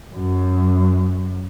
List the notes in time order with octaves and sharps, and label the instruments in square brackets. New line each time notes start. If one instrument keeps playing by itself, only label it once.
[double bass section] F#2